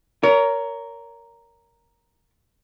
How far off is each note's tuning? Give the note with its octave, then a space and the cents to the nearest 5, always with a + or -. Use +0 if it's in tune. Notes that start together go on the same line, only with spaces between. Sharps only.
A#4 +0 C#5 +30